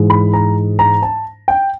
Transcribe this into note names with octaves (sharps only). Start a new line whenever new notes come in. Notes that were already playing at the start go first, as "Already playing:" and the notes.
Already playing: G#2 E3 G#3
B5
A#5
A#5
A5
G5